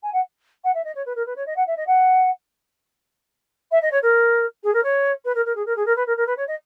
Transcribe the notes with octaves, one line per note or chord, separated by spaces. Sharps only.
G#5
F#5
F#5
E5
D#5
C#5
B4
A#4
B4
C#5
D#5
F#5
E5
D#5
F#5
E5
D#5
C#5
A#4
G#4
A#4
C#5
B4
A#4
A#4
G#4
A#4
G#4
A#4
B4
A#4
A#4
B4
C#5
D#5